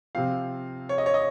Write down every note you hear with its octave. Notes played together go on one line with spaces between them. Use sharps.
C3 F3 C4 F5
C#5
D#5
C#5
D#5